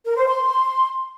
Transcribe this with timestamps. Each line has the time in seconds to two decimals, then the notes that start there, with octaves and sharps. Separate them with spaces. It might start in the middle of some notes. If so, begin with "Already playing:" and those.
0.06 A#4
0.16 C5
0.27 C6